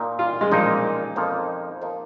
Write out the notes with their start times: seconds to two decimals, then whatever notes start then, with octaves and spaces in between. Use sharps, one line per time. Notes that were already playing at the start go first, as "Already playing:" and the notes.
Already playing: A#2 A#3 D#4
0.19 F4
0.41 G#3
0.51 A#2 F3 A#3 D#4
1.16 F2 F3 A#3 D#4
1.81 F3 A#3 D#4